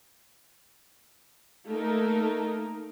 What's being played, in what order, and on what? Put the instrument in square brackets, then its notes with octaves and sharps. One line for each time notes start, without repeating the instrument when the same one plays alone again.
[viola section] A3 A#3 D#4 A#4